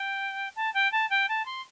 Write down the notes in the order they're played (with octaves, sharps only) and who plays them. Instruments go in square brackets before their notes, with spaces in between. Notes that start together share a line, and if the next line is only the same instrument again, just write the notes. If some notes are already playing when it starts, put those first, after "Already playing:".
Already playing: [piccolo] G5
A5
G5
A5
G5
A5
C6